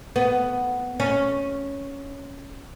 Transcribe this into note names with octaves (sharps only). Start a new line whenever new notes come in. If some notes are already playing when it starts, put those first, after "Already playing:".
B3
C#4